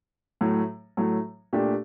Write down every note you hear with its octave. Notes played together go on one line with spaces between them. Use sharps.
A2 F#3 A3
A2 F#3 A3
A#2 A3 D4 G4